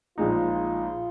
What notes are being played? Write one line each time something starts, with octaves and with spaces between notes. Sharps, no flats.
A#1 A#2 G#3 D#4 F4